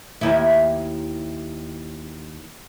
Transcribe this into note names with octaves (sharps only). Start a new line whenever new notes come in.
D#2 E4